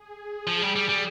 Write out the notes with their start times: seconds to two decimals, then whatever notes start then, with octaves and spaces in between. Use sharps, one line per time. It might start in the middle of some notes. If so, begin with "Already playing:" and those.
Already playing: G#4
0.47 F3
0.62 G3
0.76 G3
0.89 G3